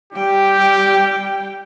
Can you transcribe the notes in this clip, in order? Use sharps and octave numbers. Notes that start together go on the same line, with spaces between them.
G3 G4 G5